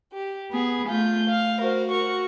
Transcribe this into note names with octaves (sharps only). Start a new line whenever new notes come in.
G4
B3 G#4
A3 F4 G6
F5
F#4 A#4 C5
F#4 A#4 C#6